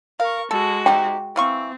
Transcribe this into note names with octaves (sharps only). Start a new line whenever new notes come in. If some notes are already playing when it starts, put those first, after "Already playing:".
A#4 F5 C#6
G#3 F#4 A4
C3 D#4 G4 G5
E3 C4 F5 C#6